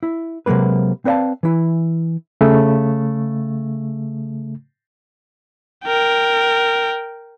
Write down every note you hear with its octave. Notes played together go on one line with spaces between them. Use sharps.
E4
C3 F#3 G#3 A#3 B4
C4 B4 D5 D#5 F5 A5
E3 E4
C#3 A3
A#4 G5